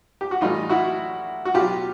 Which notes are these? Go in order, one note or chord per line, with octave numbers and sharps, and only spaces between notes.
G4
F#4
A2 E3 G3 D#4 F4
E4 F#4
F#4
B2 F#3 F4 G4